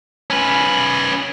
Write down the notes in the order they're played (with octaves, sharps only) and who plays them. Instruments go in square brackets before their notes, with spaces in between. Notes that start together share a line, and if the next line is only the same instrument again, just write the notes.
[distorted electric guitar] C#4 B4